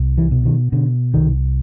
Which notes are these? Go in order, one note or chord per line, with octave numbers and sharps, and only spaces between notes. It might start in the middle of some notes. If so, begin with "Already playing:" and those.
Already playing: C2
E3
B2
D#3
B2 D3
C2 D#3